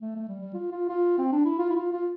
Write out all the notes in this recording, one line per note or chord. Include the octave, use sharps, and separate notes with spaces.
A3
A3
G3
G3
F4
F4
F4
C4
D4
E4
F4
E4
F4
F4